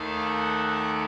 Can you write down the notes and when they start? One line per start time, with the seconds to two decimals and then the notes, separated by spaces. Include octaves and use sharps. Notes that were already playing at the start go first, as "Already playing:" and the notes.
Already playing: D#2 D#3 A3 F5
0.25 F#5
0.67 F#5